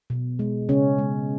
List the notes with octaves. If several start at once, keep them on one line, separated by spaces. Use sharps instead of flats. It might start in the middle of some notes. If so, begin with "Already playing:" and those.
B2
G#3
C#3 C#4
G#3